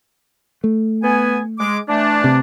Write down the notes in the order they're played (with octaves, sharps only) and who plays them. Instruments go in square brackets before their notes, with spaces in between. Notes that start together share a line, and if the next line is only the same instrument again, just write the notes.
[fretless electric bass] A3
[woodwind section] B3 G#5
G#3 D6
E3 A3 D4
[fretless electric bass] C3